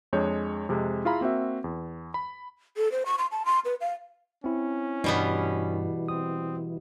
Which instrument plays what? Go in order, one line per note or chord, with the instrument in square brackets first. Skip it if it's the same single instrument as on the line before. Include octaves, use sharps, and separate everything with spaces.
[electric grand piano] F2 G#3 D4 C#5 G6
F2 C3 G#3
E4 F4 G#4 F5 A#5 B5
A#3 C4 F#4 E5
E2
B5
[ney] A4
C5
C#6
C6
A5
C6
B4
F5
[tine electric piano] C4 E4 [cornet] C#4
[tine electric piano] G2 [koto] B2 G3 B3 [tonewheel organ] E3
[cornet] C4 [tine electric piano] D#6